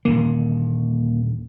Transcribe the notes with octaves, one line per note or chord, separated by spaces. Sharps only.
D#1 D#2 D3 A#3